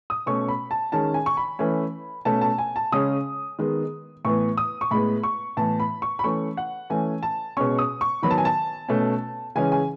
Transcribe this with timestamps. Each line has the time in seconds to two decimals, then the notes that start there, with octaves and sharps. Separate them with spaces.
0.10 D#6
0.26 B2 A3 C#4 C#6
0.49 B5
0.71 A5
0.92 D#3 G#3 C#4 A5
1.14 G#5
1.26 C#6
1.37 B5
1.59 E3 A3 C#4
2.25 B2 A3 C#4 A5
2.41 A5
2.58 G#5
2.76 A5
2.92 C#3 G#3 C#4 D#6
3.59 D#3 G#3 B3
4.25 A2 E3 B3 C#6
4.58 D#6
4.81 C#6
4.91 A2 G#3 B3 B5
5.23 C#6
5.57 A2 E3 B3 A5
5.80 B5
6.02 C#6
6.19 B5
6.24 E3 A3 C#4 C#6
6.57 F#5
6.90 E3 A3 C#4 G#5
7.23 A5
7.57 B2 G#3 C#4 C#6
7.79 D#6
8.01 C#6
8.22 D#3 F#3 B3 B5
8.31 A5
8.38 G#5
8.45 A5
8.88 B2 A3 C#4
9.55 C#3 E3 G#3 C#4 G#5
9.72 G#5